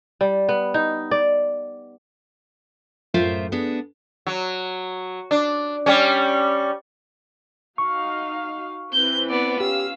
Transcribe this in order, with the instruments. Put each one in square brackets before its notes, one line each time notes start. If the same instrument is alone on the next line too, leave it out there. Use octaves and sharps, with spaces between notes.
[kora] G3
B3
D#4
D5
[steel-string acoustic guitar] F#2 A2 F4 C5 E5 G5
B3 D4 G#4
[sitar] F#3
D4
G3 C#4
[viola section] D#4 F#4 F5 [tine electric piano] C#6
[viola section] E3 C4 B4 [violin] G6
[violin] B3 D5
[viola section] C#4 F4 F5 [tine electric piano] G4 [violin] E6